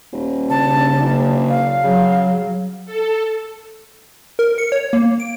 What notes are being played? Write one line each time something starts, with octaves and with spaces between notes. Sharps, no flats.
D#1
C#3 D4 A5
F#1
F5
C#3 F#3
A4
A#4
C#7
C#5
A#3
D7